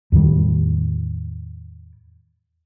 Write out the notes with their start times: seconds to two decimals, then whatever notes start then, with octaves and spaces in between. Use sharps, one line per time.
0.12 E2 A2 D#3 G3